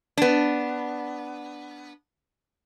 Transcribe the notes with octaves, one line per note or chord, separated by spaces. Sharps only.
B3 D4